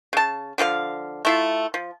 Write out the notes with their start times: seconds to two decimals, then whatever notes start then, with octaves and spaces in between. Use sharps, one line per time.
0.13 C#3 A5
0.58 D3 F3 A4 F5
1.25 A3 E4 F4
1.74 F3